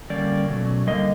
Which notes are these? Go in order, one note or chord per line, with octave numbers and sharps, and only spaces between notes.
D3 G3 A#3 C#4 D5
B2 F#3 A3 C#4
D3 G3 A#3 D#5